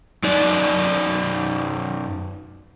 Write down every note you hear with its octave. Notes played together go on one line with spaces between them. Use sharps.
F#2 D#4 D5